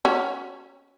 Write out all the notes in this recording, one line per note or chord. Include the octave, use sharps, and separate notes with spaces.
C#4 F#4